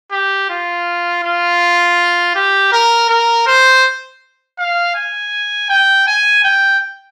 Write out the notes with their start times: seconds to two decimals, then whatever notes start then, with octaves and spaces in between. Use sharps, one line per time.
0.12 G4
0.50 F4
1.24 F4
2.35 G4
2.72 A#4
3.10 A#4
3.47 C5
4.59 F5
4.96 G#5
5.70 G5
6.07 G#5
6.44 G5